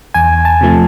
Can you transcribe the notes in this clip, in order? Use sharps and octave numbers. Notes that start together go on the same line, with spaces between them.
E2 G#5
A5
C3 F3 A3